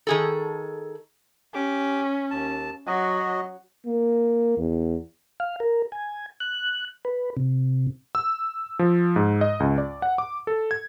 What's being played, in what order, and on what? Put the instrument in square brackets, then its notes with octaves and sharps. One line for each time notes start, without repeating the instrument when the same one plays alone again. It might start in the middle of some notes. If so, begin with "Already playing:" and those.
[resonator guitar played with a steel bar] D#3 G#4 A4
[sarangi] C#4 [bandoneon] G4 D6
[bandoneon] D#2 A5
[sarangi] F#3 [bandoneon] F#4 D#5
[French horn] A#3
E2
[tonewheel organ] F5
A#4
G#5
F#6
B4
C3
[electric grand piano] E6
F3
G#2
D#5
C#2
D5
F#5
D6
A4
G#6